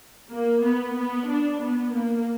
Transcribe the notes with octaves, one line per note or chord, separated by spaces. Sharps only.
A#3
B3
B3
D4
B3
A#3